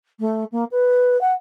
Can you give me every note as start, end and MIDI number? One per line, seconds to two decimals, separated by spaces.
0.19 0.44 57
0.51 0.64 58
0.71 1.19 71
1.20 1.31 78